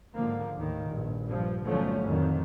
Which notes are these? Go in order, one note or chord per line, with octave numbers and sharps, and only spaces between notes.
G#2 D3 F3 A#3
D#2 A2 D#3 A#3
A#1 G2
G2 F3
G1 D3 F3 F#3 A3 C#4
F2 A2 D3 D#3 F#3